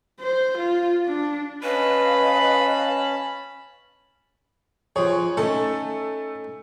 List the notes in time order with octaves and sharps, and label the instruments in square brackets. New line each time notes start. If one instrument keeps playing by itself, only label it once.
[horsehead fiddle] C5
F4
D4
[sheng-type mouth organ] C#4 A5 [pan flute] B4 [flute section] D#5 F5 [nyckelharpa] B5
[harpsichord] F2 G#4 [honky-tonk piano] C#5
[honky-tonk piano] A3 A4 [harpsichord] C#4 D#4